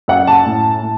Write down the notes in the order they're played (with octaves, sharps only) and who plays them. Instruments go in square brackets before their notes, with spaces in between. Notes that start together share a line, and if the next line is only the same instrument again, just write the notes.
[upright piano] F#2 F#5
A5
A2
A2